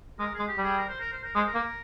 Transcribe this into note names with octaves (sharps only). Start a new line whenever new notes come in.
G#3 A#4
G#3 G#4
G4
G3
G#4
A#4
C5
A#4
C5
A#4
G#3 C5
A#4
A#3